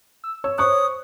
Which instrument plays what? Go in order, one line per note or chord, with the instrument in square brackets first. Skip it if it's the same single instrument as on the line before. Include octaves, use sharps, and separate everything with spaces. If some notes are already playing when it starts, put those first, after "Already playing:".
[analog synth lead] E6
[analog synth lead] C#5 [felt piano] E6
[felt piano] C5 C#6 F#6 [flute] D#6